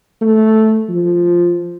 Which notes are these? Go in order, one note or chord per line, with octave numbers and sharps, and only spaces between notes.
A3
F3